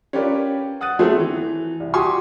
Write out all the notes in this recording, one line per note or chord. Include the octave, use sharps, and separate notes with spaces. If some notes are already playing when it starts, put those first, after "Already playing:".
C#4 F4 G4 A#4 B4 D5
F#5 D#6 F#6 A6 D#7
F#3 A3 B3 C4 F#4 G#4
E3
C2
F#4 G4 G#5 C6 C#6 D#6